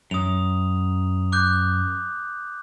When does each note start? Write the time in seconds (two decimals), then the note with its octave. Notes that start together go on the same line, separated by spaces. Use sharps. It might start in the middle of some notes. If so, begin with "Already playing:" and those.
0.11 F#2 D#6 F7
1.32 D6 F#6 G6